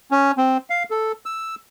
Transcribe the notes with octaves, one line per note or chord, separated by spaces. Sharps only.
C#4
C4
F5
A4
E6